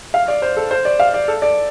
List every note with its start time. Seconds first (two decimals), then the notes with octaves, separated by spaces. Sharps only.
0.14 F5
0.28 D5
0.42 C5
0.57 A4
0.71 C5
0.85 D5
1.00 F5
1.14 D5
1.28 A4
1.42 D5